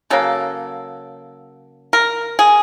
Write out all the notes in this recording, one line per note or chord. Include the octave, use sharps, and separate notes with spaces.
C#3 F#3 A#3 A4
A#4
G#4